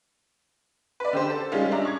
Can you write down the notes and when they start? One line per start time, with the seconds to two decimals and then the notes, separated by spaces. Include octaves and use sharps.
1.00 B4 D5
1.13 D3 G4 C5
1.30 A4
1.52 C#3 G3 G#3 C#4 D#4 F4
1.72 D4 E5 A#5
1.85 C#6 G#6